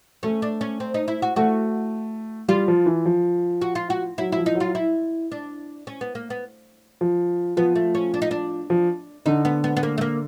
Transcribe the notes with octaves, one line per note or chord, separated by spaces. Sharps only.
A3 C#4
D4
C#4
C4
D#4
E4
F#4
A3 F#4
G3 F4
F3
E3
F3
F#4
F4
F#4
F#3 E4
E4
F3
D#4
F#3
F4
E4
D4
C#4
B3
A#3
B3
F3
F3 B3
A3
C#4
D4
D#4
D4
F3
D3 D#4
B3
B3
B3
A#3
A3
A#3